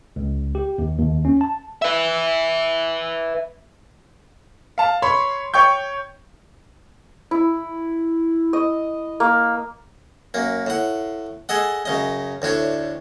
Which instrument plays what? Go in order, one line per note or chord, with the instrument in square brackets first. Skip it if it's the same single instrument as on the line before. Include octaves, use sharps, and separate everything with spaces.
[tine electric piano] C#2
G4
D#2
D#2
C#4
A5
[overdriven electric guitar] B4 E5
[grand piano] F5 A5
C#5 B5 C6
C#5 G5 C#6 G6
[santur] E4
D#5
A#3
[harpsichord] F#2 A#3
A2 F#5
G#4 A4 D#5 F#5
F#2 C#3 D#5
D2 A2 D4 C#5